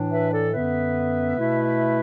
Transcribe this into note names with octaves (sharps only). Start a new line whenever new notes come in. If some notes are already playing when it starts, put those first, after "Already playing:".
Already playing: A2 E3 D4
B4 E5
A4 D5
F#2 D3 B3 B4 E5
B2 A3 E4